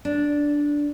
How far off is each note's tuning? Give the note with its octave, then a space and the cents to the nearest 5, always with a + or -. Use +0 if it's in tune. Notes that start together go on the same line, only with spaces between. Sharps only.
D4 -5